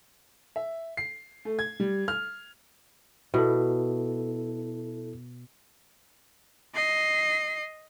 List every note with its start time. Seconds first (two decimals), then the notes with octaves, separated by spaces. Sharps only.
0.56 E5
0.97 C7
1.45 A3
1.59 G#6
1.80 G3
2.08 F6
3.34 B2 E4 A4
6.75 D#5 C7